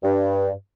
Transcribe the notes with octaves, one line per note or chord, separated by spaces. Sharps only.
G2